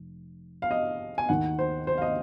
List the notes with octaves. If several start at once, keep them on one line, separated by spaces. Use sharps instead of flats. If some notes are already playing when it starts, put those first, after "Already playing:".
Already playing: F1
F5
D#5
G#5
D#2 D#3 F#5
C5
C5
F5
D#5